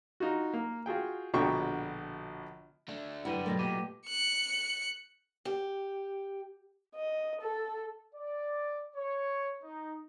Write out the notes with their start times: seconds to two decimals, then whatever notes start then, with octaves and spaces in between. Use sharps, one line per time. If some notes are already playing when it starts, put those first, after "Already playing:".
0.20 D#4 F4 F#4
0.54 A#3
0.86 F4 F#4 G#4 G5
1.34 A#1 B2 D3 F#4 G5 C#6
2.89 A3 D4
3.25 F#2 D3 G3 E4 B4 F#5 D#7
3.46 B2 F#3 A3 A#4 A#6
3.59 A#2 G4 D#7
4.08 F#6 C#7
5.45 G4
6.95 D#5
7.41 A4
8.14 D5
8.95 C#5
9.63 D#4